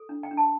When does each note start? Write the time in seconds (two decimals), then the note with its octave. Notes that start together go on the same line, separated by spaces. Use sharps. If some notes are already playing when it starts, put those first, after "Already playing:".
Already playing: A4
0.09 D4
0.23 G5
0.31 D4
0.37 A5